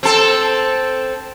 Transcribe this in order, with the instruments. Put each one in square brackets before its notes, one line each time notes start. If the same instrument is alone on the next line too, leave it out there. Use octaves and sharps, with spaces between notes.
[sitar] C4 A4